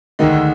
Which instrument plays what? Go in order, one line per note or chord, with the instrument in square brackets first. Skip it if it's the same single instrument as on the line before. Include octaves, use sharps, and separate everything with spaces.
[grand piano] D2 D3 G#3 [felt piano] D#3